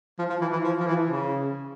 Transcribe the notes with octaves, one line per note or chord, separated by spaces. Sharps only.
F3
F3
E3
E3
F3
F3
E3
C#3